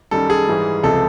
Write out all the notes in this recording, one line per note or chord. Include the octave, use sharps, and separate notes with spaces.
F#2 D#3 G3 A4
G#4
G#2 E3 G3
C#2 C3 F3 G#3 A4